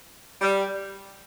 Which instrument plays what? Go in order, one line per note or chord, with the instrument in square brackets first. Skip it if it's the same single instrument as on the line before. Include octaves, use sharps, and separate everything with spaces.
[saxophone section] G3